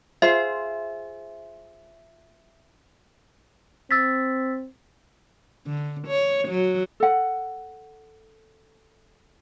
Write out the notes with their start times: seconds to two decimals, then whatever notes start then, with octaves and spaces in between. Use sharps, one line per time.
0.22 F4 G#4 C5 E5
3.91 C4 E6 A6 B6
5.67 D3
6.07 C#5
6.48 F#3
7.00 A4 F#5